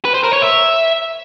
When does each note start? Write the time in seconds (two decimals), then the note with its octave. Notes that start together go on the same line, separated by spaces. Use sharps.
0.05 B4
0.14 C5
0.24 A#4
0.33 C#5
0.42 E5